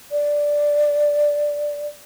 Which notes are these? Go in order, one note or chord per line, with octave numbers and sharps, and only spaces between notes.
D5